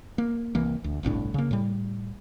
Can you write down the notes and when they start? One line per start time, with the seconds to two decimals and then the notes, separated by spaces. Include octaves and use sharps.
0.18 A#3
0.55 C2 E3 A#3
0.84 D2
1.03 G1 C2 A2 D4
1.34 C#3 A#3
1.51 A2 G3